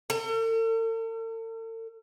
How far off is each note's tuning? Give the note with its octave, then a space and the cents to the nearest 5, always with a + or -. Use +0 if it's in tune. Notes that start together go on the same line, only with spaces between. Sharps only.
A4 +45